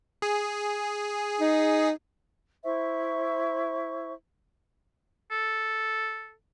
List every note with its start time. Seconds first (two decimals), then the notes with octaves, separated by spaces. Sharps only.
0.22 G#4
1.40 D#4
2.64 E4 C5 E5 C#6
5.32 A4